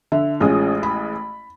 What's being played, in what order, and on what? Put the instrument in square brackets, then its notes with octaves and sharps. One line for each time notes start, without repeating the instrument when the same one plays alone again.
[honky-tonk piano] D3 [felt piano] E5
[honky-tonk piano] A1 G#3 D#6 [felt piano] C#4 F4
[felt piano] B5